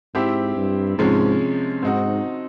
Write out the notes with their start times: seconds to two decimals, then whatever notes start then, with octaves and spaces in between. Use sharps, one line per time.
0.14 G#2 C4 E4 G4
0.56 G2
0.98 G#2 C3 F3 G#3 C#4
1.83 G#2 C4 D#4 F#4